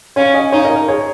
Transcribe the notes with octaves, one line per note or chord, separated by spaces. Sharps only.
C#4 C#5 F5
D#5 G#5
D#4 C#5 F5
A#4 D#5
A#4
G#4 C#5